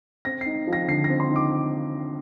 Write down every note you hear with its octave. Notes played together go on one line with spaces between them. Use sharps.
C4 A#6
D#4 C7
F3
A#6
D3 C7
A#6
C4
C6
D#4
D6